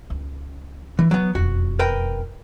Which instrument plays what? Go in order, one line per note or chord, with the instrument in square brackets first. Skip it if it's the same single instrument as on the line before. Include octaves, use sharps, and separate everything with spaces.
[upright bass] C#2
[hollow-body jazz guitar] E3 [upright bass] D4
[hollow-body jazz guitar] F#3 B3
[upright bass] E1 F2 [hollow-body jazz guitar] F#4
[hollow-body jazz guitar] A#4 B4 G5